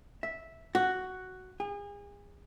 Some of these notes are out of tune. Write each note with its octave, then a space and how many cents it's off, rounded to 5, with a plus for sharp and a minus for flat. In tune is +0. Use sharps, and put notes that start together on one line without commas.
E5 -10
F#4 +5
G#4 -35